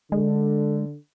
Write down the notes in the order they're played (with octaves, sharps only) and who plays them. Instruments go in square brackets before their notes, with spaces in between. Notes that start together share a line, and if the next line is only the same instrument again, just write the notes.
[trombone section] D3 [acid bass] G#3